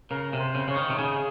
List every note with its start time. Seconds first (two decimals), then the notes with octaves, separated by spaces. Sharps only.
0.11 C#3 A#4
0.33 C3
0.40 C5
0.55 C#3
0.68 C#3 C#5
0.76 D#3
0.90 C3
0.98 C#3 G#4